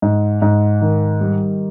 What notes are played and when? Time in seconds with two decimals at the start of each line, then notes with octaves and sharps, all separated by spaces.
0.02 G#2
0.42 G#2
0.82 D#3
1.21 G3